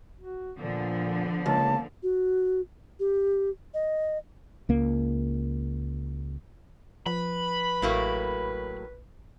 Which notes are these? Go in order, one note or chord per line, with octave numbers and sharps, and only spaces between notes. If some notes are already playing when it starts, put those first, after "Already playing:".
F#4
A#2 D3 F3 B3
C#2 A#3 A5
F#4
G4
D#5
C#2 A#3
F3 B4 B5
A1 A2 F#3 A#3